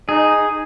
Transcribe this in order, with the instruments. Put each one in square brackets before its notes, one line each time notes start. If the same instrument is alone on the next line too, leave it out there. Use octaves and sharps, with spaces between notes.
[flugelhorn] D#4 [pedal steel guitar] G#4